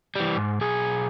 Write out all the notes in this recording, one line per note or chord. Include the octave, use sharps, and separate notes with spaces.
E3 G3
G#2
B1 G#4